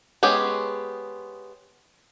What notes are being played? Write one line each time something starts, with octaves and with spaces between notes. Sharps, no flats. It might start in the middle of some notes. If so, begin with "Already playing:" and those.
G#3 B3 C#4 G4 G#4